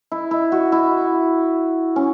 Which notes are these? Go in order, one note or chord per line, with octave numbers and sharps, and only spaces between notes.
E4
E4
F#4
E4
C#4